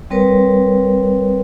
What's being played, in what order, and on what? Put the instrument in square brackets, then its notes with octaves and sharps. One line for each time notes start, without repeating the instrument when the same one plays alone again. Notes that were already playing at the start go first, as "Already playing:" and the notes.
[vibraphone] G3 C4 A#4 B4 C#5